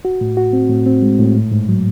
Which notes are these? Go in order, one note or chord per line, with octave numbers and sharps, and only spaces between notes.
F#4
A2
F#4
C4
A2
C4
G#3
A2
G#2
G#2
F#3